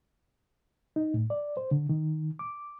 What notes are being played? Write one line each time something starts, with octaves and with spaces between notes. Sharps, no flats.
D#4
A2
D5
C5
D3
D#3
D6